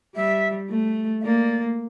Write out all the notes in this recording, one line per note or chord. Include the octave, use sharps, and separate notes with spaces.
G3 E5
A3
E5
A#3 D5